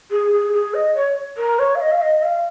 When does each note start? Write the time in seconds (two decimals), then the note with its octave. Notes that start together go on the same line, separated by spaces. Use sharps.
0.11 G#4
0.32 G#4
0.53 G#4
0.74 D#5
0.95 C#5
1.37 A#4
1.59 C#5
1.75 F5
1.81 D#5
1.92 F5
2.01 D#5
2.23 F5